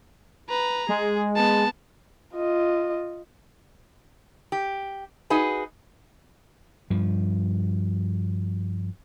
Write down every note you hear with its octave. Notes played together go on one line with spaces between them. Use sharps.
B4 A#5
G#3 G#4
B3 A5
F4 D#5
G4
D#4 F#4 G#4 B4
G2 F3